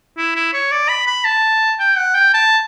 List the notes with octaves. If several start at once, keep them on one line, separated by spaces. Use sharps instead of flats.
E4
E4
C#5
D5
B5
B5
A5
G5
F#5
G5
A5